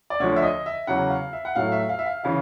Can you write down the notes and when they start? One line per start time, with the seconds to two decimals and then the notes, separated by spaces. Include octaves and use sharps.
0.10 D5
0.20 D2 D3 F3 C#5
0.36 E5
0.43 D#5
0.66 E5
0.87 E2 C#3 F#3 F#5
1.10 F5
1.33 E5
1.45 F#5
1.55 A2 F#3 A3 F5
1.72 E5
1.89 F5
1.99 E5
2.06 F5
2.24 C#3 E3 F5